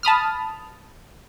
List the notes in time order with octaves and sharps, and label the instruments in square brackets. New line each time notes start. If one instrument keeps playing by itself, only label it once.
[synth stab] A5 B5 D#6 F6